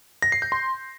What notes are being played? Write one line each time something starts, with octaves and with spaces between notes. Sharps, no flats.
A#6
C7
G6
C6